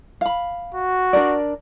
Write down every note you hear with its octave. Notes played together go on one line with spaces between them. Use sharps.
F5 B5
F#4
D4 A#4 D5